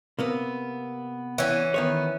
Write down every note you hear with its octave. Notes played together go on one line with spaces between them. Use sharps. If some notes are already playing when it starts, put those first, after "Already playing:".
C3 A#3 B3
E3 C#4
D#3 B3 C#5